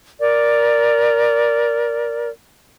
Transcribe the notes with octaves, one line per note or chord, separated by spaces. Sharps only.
A#4 D5